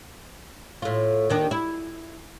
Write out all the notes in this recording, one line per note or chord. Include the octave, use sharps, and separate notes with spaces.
A2 F4
D#2 D#3 D4
E4